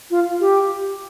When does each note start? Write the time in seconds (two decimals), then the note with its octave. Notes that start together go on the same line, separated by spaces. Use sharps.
0.10 F4
0.41 G4